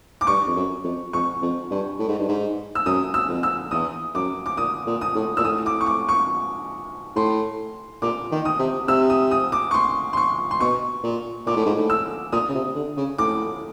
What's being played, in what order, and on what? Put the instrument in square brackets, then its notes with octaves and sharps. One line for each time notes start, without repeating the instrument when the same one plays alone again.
[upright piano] D6
[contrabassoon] G2 [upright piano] C#6
[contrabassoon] F2
F#2
F2
[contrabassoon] F2 [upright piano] C#6
[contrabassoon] F2
G2
A2
G#2
G2
G#2
[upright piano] E6
[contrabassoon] F#2 [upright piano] D#6
[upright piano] E6
[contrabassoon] F2
[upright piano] E6
[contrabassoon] E2 [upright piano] D#6
[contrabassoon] F#2 [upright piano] D6
[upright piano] D6
[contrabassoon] A#2 [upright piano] D#6
[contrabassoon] A#2
[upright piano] D#6
[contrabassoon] A2
[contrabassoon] A#2 [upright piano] E6
[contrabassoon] A2 [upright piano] D#6
[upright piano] D6
C#6
D6
C#6
[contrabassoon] A2 [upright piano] C6
[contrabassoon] A#2 [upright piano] D6
[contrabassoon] D#3
[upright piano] D#6
[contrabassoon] C3
[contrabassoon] C3 [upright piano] E6
[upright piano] D#6
D#6
D6
C#6
C6
C6
C#6
C6
[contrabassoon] B2 [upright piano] C#6
[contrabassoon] A#2
[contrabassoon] A#2 [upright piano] D6
[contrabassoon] A2
G#2
A2
[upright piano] E6
[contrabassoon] A#2 [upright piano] D#6
[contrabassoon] C#3
C3
D3
C#3
[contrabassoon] A2 [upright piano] D6